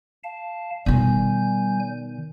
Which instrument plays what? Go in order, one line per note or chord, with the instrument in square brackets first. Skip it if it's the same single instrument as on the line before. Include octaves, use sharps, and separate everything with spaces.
[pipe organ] F5 A5
[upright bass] B2 D#3 [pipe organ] G3 G#5 G6